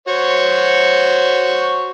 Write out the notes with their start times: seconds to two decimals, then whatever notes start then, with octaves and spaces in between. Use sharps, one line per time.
0.08 F#4 C5 C#5